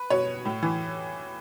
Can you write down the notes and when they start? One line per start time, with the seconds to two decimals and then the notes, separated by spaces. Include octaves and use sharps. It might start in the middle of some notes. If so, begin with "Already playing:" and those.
Already playing: B4
0.10 B2 C#5
0.45 A2
0.62 E3